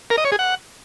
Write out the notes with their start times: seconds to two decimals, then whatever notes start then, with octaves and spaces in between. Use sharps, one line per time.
0.10 A#4
0.18 D#5
0.25 C#5
0.32 G#4
0.39 F#5